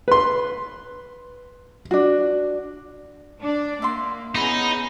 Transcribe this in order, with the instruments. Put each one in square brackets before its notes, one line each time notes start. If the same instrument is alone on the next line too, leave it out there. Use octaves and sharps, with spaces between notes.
[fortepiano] B4 C6
[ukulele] D4 F#4
[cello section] D4 D5
[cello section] A#3 [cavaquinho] E5 F#5 C6
[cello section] B3 C#4 G#4 [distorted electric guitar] D#4 [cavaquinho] E4 B5